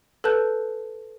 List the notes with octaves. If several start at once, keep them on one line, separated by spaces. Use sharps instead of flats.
A4 B4 A5 F#6 G6